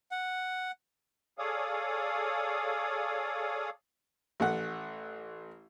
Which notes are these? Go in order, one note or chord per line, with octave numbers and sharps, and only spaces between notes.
F#5
G#4 A4 C#5 D5 F5 D#6
A1 A3 F#5